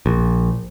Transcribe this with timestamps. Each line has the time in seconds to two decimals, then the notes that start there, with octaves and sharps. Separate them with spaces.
0.06 A#1